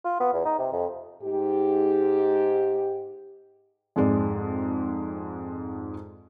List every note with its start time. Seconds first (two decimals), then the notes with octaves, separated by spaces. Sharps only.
0.05 F4
0.20 B3
0.33 E2
0.45 D#4
0.59 C3
0.72 F2
1.22 G#2 G4
3.96 F2 G#2 G#3 D5